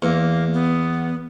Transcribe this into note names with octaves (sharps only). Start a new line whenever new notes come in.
E2 A#3
B3